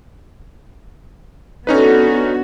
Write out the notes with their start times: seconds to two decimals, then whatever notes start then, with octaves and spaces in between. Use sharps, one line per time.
1.67 D3 B3 C#4 D#4 F#4 B4